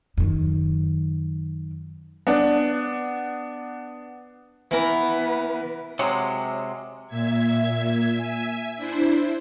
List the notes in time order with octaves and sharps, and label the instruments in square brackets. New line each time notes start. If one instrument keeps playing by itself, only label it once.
[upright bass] F#2 D#3
[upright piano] B3 D4
[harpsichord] E3 A#4 [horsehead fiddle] B3 B4
[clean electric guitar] C3 G#3 [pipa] F#3
[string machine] A#2 E5 G#6
E5 G#5
D4 E4 C5